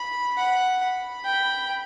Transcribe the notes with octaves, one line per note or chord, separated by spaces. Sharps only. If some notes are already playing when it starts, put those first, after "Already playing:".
Already playing: B5
F#5
B5
G5